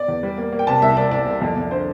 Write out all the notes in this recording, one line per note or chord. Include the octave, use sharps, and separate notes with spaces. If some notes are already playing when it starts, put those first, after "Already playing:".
Already playing: D5
E2
G3
A#3
A#3
G5
C3 A5
C2 E5
C2 D5
C2 D5
C2
F2
F2
D3 C5